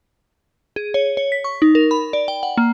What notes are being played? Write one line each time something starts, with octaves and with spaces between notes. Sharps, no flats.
G#4
C#5
C#5
B6
C#6
D#4
A#4
B5
D5
G5
F#5
A#3